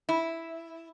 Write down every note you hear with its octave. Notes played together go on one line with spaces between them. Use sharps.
E4